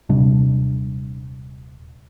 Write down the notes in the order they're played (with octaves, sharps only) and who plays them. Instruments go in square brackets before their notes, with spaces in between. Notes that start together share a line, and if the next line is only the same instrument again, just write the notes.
[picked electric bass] D#1 C3 G3 D4